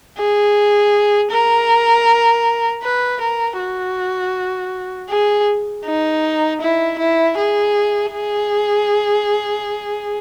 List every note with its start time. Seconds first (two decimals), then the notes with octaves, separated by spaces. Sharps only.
0.18 G#4
1.32 A#4
2.83 B4
3.21 A#4
3.59 F#4
5.09 G#4
5.85 D#4
6.61 E4
6.98 E4
7.37 G#4
8.12 G#4